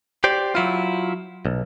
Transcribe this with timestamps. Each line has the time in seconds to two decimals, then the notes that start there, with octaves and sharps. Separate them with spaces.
0.24 G4 C5 D5
0.55 F#3 E4 F4
1.45 B1